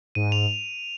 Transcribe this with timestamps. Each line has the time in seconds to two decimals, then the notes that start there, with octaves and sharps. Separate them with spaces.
0.15 G#2 D#7
0.32 F7